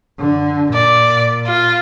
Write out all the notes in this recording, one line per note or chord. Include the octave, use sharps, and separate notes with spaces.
F#2 D3
A#2 D5
F4